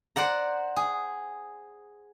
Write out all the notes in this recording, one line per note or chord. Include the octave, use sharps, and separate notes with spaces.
C5 D5 F#5 A#5
G#4